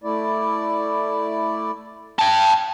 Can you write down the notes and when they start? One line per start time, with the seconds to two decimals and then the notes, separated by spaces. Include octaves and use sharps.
0.04 A3 E4 D5
2.19 G5 A5